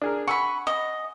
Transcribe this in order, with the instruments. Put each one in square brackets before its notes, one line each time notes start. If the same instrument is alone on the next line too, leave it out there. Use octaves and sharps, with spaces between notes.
[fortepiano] D4 G#4 A#4
[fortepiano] F#5 G#5 E6 [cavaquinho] B5 C#6
[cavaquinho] D#5